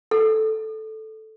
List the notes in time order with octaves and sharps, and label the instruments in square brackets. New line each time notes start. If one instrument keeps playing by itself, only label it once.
[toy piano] A4